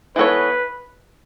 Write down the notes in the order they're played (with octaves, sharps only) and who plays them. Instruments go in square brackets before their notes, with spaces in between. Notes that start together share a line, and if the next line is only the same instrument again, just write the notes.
[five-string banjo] E3 B3 F#4 A4 C#5 [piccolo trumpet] B4